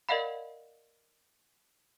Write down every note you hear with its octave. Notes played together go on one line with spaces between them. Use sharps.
A#4 D5 D#5 F5 F#5 B5